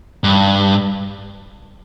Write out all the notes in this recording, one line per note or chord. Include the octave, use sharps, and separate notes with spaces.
G2